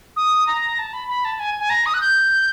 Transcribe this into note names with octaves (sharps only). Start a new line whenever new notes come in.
D#6
A#5
A5
B5
B5
A5
G#5
G#5
A#5
D#6
F#6
G6